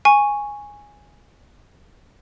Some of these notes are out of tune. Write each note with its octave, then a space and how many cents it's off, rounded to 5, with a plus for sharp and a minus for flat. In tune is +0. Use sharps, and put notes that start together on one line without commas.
G#5 -5 C#6 +0